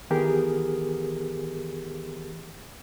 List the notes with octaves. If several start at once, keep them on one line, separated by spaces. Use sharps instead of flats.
D#3 E3 B3 G4 G#4 A#4